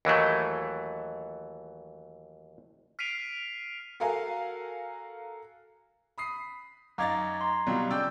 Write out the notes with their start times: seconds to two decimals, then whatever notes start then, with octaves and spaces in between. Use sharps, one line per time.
0.05 D#2 E3 F#3 A3
2.99 F6 B6 C7 D7 D#7 F7
4.00 F#4 A4 A#4 F5 G#5
6.18 B5 D#6 C7
6.98 F#2 D#4 F5 A#5 D6 G#6 A6
7.41 A#5 C6
7.67 B2 F#3 G3 F4
7.91 C#3 D5 G5 E6 G6